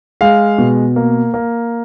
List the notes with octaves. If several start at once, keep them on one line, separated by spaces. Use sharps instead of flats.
G#3 F5
B2
A#3
A#3